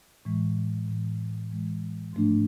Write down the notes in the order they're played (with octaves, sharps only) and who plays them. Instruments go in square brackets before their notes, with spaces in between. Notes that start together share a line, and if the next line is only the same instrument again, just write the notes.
[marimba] A2 E3 G#3
A2 E3 G#3
A2 E3 G#3
G#2 F3 A3 D4